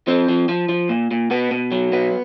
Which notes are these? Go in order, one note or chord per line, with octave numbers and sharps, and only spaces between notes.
F3 C4
F3
F3
F3
A#2
A#2
B2 B3
B2
F#3
B2 B3